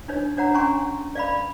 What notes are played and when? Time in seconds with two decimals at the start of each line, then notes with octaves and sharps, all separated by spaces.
0.08 D4 D#4 C#5
0.37 D4 C#5 F#5 A#5
0.54 C#4 G#5 A#5 C6 C#6
1.15 D5 F5 B5